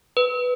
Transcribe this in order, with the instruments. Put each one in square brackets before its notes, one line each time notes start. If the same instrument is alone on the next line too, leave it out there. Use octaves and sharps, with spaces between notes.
[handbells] B4